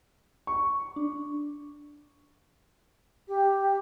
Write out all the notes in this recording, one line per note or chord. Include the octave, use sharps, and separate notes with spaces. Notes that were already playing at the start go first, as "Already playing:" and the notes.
C#6
D4
G4